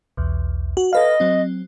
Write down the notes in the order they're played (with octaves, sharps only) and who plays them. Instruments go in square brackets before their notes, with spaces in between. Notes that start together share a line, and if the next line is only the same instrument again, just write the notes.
[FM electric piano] B1 E2
F#4
[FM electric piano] A4 B4 F5 [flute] D#5
[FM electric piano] F#3 C4